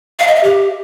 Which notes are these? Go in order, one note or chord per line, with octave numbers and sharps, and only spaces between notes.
F5
D#5
E5
G4